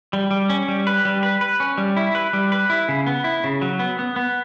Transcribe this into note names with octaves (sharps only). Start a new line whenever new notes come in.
G3
G3
C#4
G3
B4
G3
B4
B4
C#4
G3
E4
B4
G3
B4
E4
C#3
B3
E4
C#3
F#3
B3
B3
B3